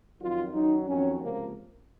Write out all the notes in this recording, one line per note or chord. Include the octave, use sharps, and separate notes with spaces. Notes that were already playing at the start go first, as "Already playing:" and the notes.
F2 D#3 F#3 F4
F#2 D#3 F#3 D#4
F2 D#3 F#3 C#4
C#2 C3 F3 A#3